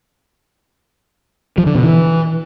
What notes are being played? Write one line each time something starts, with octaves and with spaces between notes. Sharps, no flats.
F3
D3
B2
E3